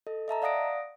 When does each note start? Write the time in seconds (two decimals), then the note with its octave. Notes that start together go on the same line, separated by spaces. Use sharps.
0.07 A4 D#5
0.28 D#5 E5 A5 A#5
0.42 D5 F5 F#5 D#6 A#6 D7